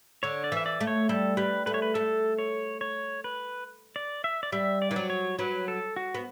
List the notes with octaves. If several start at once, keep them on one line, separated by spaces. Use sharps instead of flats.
D3 C#5
D5
E3
E5
D5
A3
C#5
G3 A4
G3 B4
A3 B4
C#5
B4
A3 A4
C#5
C#5
B4
D5
E5
D5
G3 E5
D5
E3
F#3
C#5
F#3 B4
A4
F#4
B3